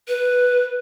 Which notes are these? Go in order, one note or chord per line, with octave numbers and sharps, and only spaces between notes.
B4